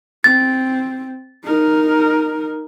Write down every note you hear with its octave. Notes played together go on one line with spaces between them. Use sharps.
C4 A6
D#4 A#4